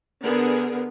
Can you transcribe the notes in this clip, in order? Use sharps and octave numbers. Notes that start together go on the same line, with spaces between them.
D3 B3 G#4 A#4